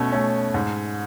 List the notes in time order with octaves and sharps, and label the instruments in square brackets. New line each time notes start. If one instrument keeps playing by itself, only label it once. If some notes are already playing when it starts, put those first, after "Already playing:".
Already playing: [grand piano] B2 A3 C#4
A3 C#4
G#2